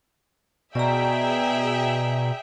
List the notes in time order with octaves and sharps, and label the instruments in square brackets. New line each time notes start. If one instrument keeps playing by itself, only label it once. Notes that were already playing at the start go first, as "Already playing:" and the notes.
[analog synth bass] B2 [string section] G#4 E5 G5 [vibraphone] D5 A#5